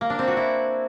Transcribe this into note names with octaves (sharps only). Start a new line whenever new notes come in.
A#3
D4
C4
F#4
E4